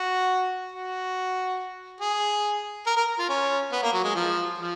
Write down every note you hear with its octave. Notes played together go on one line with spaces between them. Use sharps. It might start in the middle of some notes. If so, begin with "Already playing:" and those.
Already playing: F#4
F#4
G#4
A#4
A#4
F4
C#4
B3
A#3
F#3
G#3
F3
F3